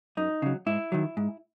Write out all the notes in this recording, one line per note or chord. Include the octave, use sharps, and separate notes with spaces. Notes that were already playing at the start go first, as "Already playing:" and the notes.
F#2 D#4
C#3 F#3
G#2 E4
D#3 F#3
G#2